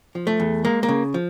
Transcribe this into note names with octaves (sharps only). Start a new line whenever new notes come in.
F3
A3
E2
G#3 A#3
A#3
C#3
F3